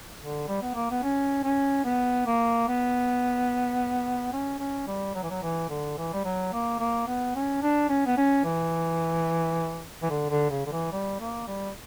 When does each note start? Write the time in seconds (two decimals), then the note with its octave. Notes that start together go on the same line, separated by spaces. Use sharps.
0.20 D3
0.48 G3
0.62 B3
0.75 A#3
0.91 B3
1.03 C#4
1.43 C#4
1.85 B3
2.26 A#3
2.68 B3
4.33 C#4
4.59 C#4
4.87 G3
5.15 F#3
5.23 E3
5.30 F#3
5.43 E3
5.69 D3
5.98 E3
6.14 G3
6.25 F#3
6.53 A#3
6.79 A#3
7.07 B3
7.35 C#4
7.62 D4
7.89 C#4
8.07 B3
8.17 C#4
8.44 E3
10.03 E3
10.10 D3
10.30 D3
10.51 C#3
10.66 D3
10.72 E3
10.92 G3
11.20 A#3
11.47 G3